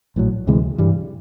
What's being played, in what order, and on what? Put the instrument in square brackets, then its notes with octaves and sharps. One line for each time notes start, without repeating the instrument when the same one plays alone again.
[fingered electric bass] A#1 A2 F#3
D2 C3 E3 G#3
G2 E3 G3